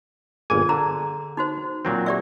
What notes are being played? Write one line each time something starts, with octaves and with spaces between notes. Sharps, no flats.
G1 A#2 G#4 G#5
D3 A#5
D#4 F#4 C5
A#2 F#3 C4
G4 D5 E5